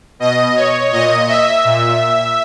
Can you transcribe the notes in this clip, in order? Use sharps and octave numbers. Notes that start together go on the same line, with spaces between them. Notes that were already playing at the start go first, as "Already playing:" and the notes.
B2 D#5
C#5
A#2 D#5
E5
A#2